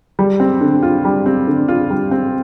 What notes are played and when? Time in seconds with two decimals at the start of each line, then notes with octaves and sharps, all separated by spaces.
0.19 G3
0.40 C4
0.61 D3
0.83 F4
1.05 G3
1.26 C4
1.47 D3
1.68 F4
1.90 G3
2.11 C4